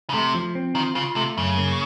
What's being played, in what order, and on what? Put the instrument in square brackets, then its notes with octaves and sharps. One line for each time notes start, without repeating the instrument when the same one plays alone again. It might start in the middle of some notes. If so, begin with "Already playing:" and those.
[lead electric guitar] C#3
[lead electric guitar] C3 [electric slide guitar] A3
[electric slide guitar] F3
C4
[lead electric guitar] D#3 [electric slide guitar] F4
[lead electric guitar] C#3 [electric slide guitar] F4
[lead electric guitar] C3 [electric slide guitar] A3
[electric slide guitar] F#2 [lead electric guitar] C#3
[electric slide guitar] A#3